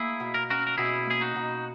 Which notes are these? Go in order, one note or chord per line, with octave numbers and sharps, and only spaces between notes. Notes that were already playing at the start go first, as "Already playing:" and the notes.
Already playing: A#3 E4 G#4
B2
A#4
C#4 F#4 A#4
A#4
B2 E4 G#4
A#3 G#4
D#4 F#4
B2